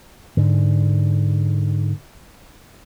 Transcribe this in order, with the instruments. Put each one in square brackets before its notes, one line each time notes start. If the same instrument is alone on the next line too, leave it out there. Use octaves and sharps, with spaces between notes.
[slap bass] G#2 D3